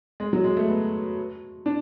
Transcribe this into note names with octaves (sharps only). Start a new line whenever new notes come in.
G#3
F#3
G#3
A3
B3
D4